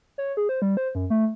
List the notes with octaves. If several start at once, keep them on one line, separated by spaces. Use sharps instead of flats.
C#5
G#4
C5
G3
C5
F#2
A3